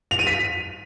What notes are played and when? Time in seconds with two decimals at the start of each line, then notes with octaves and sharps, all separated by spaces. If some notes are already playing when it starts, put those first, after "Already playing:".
0.11 F7
0.19 D#7
0.27 B6